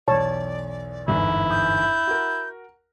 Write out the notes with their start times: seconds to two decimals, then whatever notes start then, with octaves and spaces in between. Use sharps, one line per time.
0.08 B1 E2 C#5 D5 A5
1.08 G1 E2 G#2 E4
1.51 D#6 G6
2.07 F#4 A#4